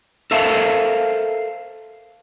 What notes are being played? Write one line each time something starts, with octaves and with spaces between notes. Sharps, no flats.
A4 A#4 C5 E5 F5 A5